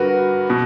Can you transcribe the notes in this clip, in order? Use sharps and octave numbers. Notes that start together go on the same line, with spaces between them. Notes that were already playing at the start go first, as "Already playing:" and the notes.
Already playing: G2 D3 F#4 A#4 B4
B2